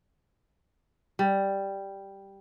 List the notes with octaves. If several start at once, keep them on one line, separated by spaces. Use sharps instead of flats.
G3